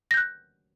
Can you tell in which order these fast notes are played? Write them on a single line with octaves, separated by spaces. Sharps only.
A#6 G6 F#6